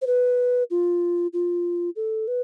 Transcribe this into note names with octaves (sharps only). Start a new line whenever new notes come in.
C5
B4
F4
F4
A4
B4